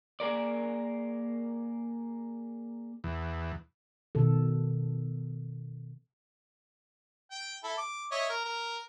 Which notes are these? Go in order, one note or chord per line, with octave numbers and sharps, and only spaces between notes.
A#3 G#4 A#4 D5
E2
B2 D#3 A4
G5
E4 A4
D6
C#5 D#5 E5
A#4
A#4